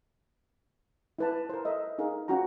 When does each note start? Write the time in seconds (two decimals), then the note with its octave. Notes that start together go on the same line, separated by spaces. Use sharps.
1.19 E4 B4 A5
1.49 A#4 C5
1.65 A4 D#5 E5
1.98 D#4 G#4 A#4 F5
2.28 C#4 F4 F#4 G5 A#5